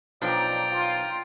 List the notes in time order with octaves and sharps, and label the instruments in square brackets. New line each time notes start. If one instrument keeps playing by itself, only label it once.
[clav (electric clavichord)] B1 F3 D4 [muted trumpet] D5 [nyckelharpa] G5 A#5
[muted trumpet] F4